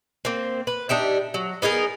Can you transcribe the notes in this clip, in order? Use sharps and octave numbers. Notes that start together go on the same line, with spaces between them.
A#3 C4
B4
D4 D#4 G4 E5
F#3
B3 D#4 G#4 A#4